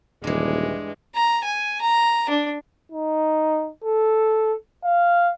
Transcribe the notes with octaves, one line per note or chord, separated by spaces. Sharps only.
D#1 G2 E3 G#3
A#5
G#5
A#5
D4
D#4
A4
F5